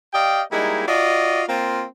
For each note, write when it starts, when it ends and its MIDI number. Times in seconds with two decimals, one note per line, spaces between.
0.14 0.43 67
0.14 0.43 74
0.14 0.43 75
0.14 0.43 77
0.14 0.43 79
0.52 0.84 55
0.52 0.84 56
0.52 0.84 58
0.52 0.84 63
0.52 0.84 64
0.88 1.43 65
0.88 1.43 66
0.88 1.43 74
0.88 1.43 75
1.48 1.83 58
1.48 1.83 60
1.48 1.83 65